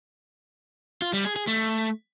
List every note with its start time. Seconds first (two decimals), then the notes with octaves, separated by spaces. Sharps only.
1.02 F4
1.13 G3
1.25 G#4
1.36 G#4
1.47 A3